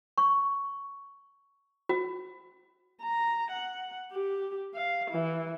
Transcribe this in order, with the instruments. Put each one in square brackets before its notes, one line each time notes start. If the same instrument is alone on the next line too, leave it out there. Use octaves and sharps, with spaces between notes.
[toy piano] C#6
F#4
[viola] A#5
F#5
G4
F5
E3